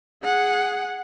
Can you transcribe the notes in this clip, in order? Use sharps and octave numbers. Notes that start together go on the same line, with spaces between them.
G#4 F#5